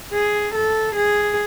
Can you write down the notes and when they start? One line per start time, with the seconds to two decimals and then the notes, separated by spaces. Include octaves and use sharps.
0.14 G#4
0.55 A4
0.96 G#4